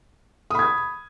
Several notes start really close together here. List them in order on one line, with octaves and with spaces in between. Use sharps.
D#6 B5 G#6